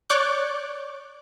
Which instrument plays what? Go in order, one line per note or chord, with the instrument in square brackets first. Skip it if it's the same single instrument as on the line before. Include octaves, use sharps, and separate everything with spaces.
[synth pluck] C#5 D5 C#6 D6 F#6 G6